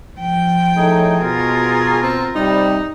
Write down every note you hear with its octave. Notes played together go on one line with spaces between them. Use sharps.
F3 G5
A2 A3 D#4 G#4
B2 F4 A#4
C4
C3 G3 D#4